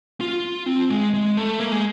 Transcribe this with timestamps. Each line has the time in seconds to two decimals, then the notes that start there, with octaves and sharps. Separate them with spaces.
0.21 F4
0.66 C4
0.90 G#3
1.14 G#3
1.37 A3
1.60 A#3
1.72 G#3